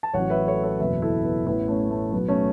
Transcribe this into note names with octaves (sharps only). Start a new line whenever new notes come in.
A5
A1 A2 F#3 C#5 F#5
B4 E5
A4 C#5
A4 C#5
F#1 E2 B2 B4 E5
E4 A4
B3
A1 A2 E3 B3 E4
A3 C#4
A3
B1 B2 F#3 B3
A3 C#4